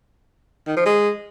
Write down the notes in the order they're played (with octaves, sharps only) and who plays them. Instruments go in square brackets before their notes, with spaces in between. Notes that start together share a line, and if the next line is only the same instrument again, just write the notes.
[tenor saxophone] D#3
F3
G#3